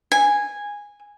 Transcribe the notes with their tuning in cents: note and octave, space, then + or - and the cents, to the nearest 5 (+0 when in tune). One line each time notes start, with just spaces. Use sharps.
G#5 -10